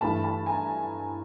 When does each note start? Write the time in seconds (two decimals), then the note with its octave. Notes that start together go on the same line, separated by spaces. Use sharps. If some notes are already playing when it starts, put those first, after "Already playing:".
0.01 G2 E3 A3 A5 B5
0.24 A5 B5
0.46 G#5 A#5